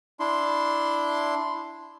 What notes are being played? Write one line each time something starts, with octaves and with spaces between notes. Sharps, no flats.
D4 E4 C6